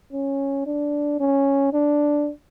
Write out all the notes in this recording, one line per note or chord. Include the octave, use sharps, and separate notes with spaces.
C#4
D4
C#4
D4